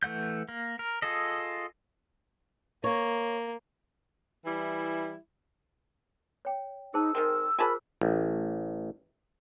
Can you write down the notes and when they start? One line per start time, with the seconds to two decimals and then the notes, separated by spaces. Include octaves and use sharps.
0.03 E3 A3 F#5 G6
0.49 A#3
0.79 A#4
1.02 F4 G#4 A4 D#5
2.84 A#3 C#5
4.45 E3 G3 E4
6.45 C#5 G5
6.94 D#4 G#4 C5 A5 E6
7.15 D#3 G#3 C4 A#4
7.59 F4 G#4 A#4 C5 G#5 A5 B5
8.01 A1